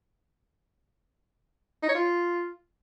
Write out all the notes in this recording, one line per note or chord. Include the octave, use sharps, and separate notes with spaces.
D#4
C#5
F4